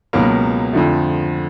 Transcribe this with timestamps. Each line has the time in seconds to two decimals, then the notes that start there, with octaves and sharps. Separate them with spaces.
0.13 C#2 B2 F#3 A#3
0.73 F2 D3 F3 A3